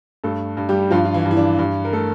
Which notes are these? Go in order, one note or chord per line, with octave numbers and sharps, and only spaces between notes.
G2 A3 A4
G2
G3 G4
G2 F3 F4
F4
E3 E4
G2
E4
D4
G2
A#4
A3 A4